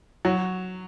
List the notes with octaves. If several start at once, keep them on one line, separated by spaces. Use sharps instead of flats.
F#3